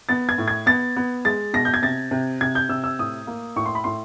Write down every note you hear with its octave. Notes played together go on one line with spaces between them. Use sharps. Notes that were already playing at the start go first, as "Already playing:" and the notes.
B3 A6
G#6
A2
G#6
B3 A6
B3
G#3 A6
B2 A#6
G6
G#6
C3 A6
C3
C3 G#6
G6
C3 E6
E6
A2 D#6
A#3
A2 C#6
C6
B5
A2 C6